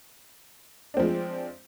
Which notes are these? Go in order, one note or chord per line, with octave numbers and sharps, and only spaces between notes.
F3 G#3 C4 D4